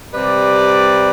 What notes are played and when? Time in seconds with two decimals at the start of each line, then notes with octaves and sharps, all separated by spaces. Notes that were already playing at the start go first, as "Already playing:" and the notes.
0.14 C3 G3 B4 D5